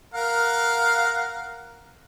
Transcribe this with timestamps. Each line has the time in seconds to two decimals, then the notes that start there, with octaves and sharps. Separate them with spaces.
0.14 A#4 F5 F#5